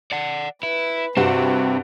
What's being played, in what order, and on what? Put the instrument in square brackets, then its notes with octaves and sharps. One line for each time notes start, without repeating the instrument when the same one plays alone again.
[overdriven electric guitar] D5 F#5
[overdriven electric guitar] E4 [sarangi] B4
[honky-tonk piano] G2 B4 F#5 [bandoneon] C3 [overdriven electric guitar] C4 [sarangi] F#4